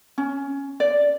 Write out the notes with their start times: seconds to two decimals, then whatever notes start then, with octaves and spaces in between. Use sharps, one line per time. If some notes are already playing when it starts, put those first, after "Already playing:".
0.18 C#4
0.80 D5